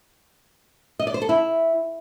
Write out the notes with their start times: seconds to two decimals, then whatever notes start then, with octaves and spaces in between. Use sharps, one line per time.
0.99 D#5
1.07 D5
1.14 C5
1.22 A4
1.29 E4